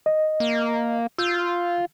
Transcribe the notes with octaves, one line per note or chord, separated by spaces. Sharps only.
D#5
A#3
F4 E6 G6